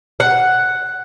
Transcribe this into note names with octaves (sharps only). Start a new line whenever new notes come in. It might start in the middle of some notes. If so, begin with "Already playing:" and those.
F#5